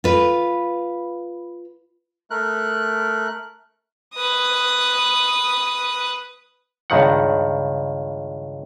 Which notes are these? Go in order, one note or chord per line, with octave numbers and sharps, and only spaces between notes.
F4 B4
A3 A#4 F#6
B4 D#6
C#2 G2 D#3 F#5